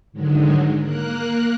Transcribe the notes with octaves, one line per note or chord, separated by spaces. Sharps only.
G#2 D3 D#3 F#3 G#3
A#3 A#4 F#6